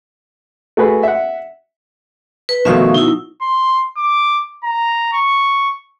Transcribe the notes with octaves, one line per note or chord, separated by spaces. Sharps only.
A3 F#4 G#4 B4
E5 F#5
B4
B2 D#3 F3 F#3 A3 E5 F5 C#6
D#4 E4
C6
D6
A#5
C#6